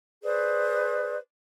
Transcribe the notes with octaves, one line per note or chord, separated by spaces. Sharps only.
G#4 B4 C5 D5